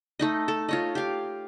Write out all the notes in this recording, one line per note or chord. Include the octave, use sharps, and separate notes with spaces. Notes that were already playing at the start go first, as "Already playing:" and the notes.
A3 D#4 D#5
A4
F4 C#5 D#5
G4 F5